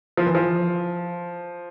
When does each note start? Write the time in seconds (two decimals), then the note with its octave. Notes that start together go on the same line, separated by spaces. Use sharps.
0.17 F3
0.26 E3
0.35 F3